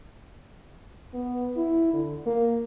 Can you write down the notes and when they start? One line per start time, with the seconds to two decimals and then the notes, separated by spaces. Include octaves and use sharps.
1.14 B3
1.57 E4
1.94 D3
2.26 A#3